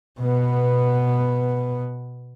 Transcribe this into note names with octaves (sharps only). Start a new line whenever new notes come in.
B2 B3